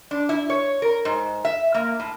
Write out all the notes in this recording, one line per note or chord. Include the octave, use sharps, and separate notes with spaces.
D4
E4
C#5
A#4
G#2
E5
A#3
A2